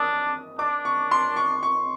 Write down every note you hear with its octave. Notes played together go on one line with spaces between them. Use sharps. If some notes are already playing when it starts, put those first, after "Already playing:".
Already playing: D4 D#6
D4 D6
C#6
C6
C#6
C#6